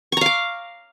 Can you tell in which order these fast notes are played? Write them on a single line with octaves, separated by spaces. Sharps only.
C#6 A#5 F5 D6